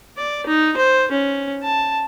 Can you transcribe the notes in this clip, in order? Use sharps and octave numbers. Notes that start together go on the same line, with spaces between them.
D5
D#4
C5
C#4
A5